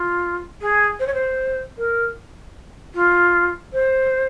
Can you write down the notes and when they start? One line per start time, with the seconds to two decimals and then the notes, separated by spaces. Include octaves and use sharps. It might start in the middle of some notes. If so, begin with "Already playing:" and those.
Already playing: F4
0.61 G#4
0.99 C5
1.07 C#5
1.14 C5
1.78 A#4
2.94 F4
3.73 C5